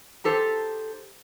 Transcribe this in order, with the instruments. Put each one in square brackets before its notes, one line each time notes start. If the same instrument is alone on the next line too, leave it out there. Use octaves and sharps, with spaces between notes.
[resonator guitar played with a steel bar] D#4 G4 A4 C5